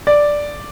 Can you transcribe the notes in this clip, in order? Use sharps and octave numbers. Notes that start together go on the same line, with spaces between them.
D5